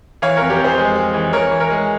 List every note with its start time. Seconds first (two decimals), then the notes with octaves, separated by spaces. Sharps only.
0.22 E3 C#5 F5
0.36 F2 A#4 C#5
0.50 G4 A#4
0.60 F2 G#4 C5
0.78 G#3
0.96 G#3
1.14 E3
1.33 E3 A#4 C#5
1.51 E3
1.60 A#4 C#5
1.70 G#3